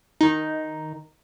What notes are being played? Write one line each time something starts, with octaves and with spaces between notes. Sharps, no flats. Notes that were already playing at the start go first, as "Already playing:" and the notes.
D#3 D#4